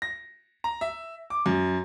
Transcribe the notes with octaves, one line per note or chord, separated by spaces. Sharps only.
A#6
A#5
E5
D6
F#2